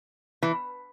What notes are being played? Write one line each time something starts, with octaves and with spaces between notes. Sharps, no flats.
E3